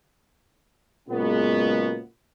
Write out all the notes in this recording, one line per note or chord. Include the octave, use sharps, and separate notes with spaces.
A#2 C#3 F#3 G#3 B3